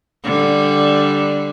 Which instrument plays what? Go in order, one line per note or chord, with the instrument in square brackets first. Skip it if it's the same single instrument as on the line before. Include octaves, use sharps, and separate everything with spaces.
[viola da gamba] D3 G3